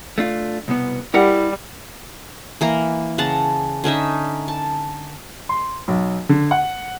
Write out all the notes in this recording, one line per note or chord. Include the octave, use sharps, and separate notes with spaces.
A3 D4 F4
C2 B2 B3
G3 E4 A#4 F#5
E3 A#3 A#5
C#3 F#5 A5 A#5
D3 C#4 D#4 E5
A5
C6
B1
D3
F#5